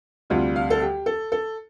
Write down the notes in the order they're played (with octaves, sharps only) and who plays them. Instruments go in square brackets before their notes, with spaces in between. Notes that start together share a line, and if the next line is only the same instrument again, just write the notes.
[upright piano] D2 C3 G3 F4
F5
A4
G4
A4
A4